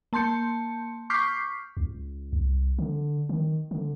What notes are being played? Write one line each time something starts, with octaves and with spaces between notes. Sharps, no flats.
A#3 A5 C6 G6 C#7
C#6 D6 F6 G6 B6 C7
C#2
C2
D3
D#3
D3